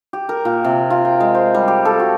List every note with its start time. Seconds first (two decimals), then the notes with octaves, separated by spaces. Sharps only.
0.13 G4
0.29 A#4
0.45 A#2
0.64 C3
0.90 F4
1.05 G5
1.20 G#3
1.34 C5
1.54 G3
1.68 G4
1.85 A4
2.00 F#4